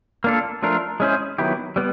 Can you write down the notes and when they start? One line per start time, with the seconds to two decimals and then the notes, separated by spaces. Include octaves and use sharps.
0.24 A#3 D4 F4 A4
0.62 F3 A3 D4 F4 A#4
1.00 G#3 C#4 E4 G#4 C5
1.38 D#3 F#3 B3 E4 G4
1.76 G3 B3